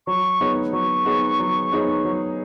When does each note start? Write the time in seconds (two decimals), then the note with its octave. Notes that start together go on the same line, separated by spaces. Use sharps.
0.07 F#3 C#6
0.41 B3 D#4 G#4 C#5
0.73 F#3 C#6
1.05 B3 D#4 G#4 C#5
1.39 F#3
1.72 B3 D#4 G#4 C#5
2.05 F#3